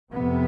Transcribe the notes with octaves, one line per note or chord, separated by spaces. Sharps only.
F2 C3 B3